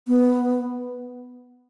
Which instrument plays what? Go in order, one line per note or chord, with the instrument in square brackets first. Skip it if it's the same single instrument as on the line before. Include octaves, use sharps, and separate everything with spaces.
[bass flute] B3